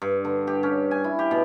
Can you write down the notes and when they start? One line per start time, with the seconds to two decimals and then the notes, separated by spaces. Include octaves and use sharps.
0.02 G2
0.25 D3
0.47 G4
0.63 C#4
0.91 G#5
1.04 E4
1.19 G4
1.31 B2